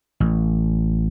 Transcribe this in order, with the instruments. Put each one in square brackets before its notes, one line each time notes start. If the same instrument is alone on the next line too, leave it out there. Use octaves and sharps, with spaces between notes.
[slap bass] A1